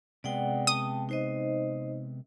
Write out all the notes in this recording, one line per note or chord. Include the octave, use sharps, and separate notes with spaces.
C3 G#3 B3 D5 F#5 G5
G5 A5 D#6
D#4 C5 D#5